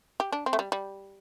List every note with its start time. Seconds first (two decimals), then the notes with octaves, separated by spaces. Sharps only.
0.20 G4
0.32 D4
0.46 C4
0.53 A3
0.59 G3
0.72 G3